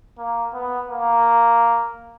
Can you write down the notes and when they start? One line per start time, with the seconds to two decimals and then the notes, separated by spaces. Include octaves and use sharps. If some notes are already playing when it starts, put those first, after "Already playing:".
0.18 A#3
0.54 B3
0.90 A#3